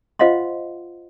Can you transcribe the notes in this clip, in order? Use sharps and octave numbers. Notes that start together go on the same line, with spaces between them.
F4 C5 D#5 F5 F#5 C6